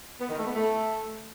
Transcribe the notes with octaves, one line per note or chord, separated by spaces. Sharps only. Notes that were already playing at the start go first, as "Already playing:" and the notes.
B3
D#3
A3
B3
A3